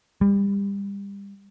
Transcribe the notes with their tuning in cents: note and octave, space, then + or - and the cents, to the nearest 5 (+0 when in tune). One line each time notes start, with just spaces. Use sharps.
G3 +30